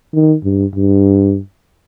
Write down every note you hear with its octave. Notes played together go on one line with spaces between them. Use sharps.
D#3
G2
G2